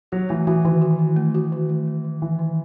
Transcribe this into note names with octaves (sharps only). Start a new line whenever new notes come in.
F#3 F#4
E3 A3
E3 F#4
D#3 E3
F#4
D#3
A3
F#4
D#3
A3
A3
D#3
D#3 E3
D#3